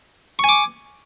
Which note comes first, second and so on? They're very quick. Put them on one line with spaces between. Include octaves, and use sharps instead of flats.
C#6 G#5 D6